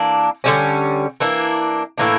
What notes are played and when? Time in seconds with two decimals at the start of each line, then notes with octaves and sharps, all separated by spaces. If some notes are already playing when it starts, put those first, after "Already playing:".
Already playing: E3 A#3 D4
0.44 D3 G3 C#4
1.20 E3 A#3 D4
1.98 A2 E3 A#3 D4